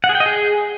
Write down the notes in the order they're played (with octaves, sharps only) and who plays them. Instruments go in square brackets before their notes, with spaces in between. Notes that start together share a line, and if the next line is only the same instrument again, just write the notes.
[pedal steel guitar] F#5
G#4
G5
D#5
G#4